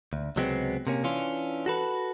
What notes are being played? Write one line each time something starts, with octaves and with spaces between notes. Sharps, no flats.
D2
C#2 C3 F#3 G#3 B3 C4
C3 A#3 C#4
E3 C#4 D4 F4
F#4 A4 B4